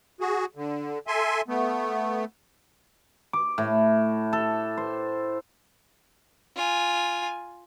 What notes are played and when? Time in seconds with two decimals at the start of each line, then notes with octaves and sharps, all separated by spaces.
0.20 F#4 G#4
0.55 D3
1.07 A4 E5 G#5 C6
1.48 A3 B3
3.33 D6
3.58 A2
4.33 A4
4.77 C5
6.56 F4 G#5